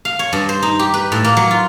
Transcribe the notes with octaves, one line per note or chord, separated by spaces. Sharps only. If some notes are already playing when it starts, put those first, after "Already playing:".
F5
C#5
G2
C5
D#4
G4
B4
A2
A#3
F#3
F4